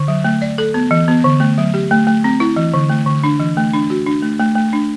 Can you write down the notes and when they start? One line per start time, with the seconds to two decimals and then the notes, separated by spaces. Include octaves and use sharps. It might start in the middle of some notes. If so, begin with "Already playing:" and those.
Already playing: D3
0.08 F#3
0.24 A3
0.42 D5
0.58 A4
0.74 B3
0.91 E3
1.08 B3
1.24 D3
1.40 A3
1.58 F#3
1.74 G4
1.91 A3
2.07 A3
2.24 C4
2.40 E4
2.56 E3
2.74 D3
2.89 A3
3.06 D3
3.24 D4
3.40 E3
3.57 A3
3.74 D4
3.90 F#4
4.06 D4
4.22 A3
4.40 A3
4.55 A3
4.73 D4